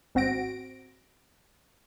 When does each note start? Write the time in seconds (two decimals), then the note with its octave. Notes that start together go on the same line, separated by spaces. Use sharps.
0.15 G#1 C4 F#4 A#6 D7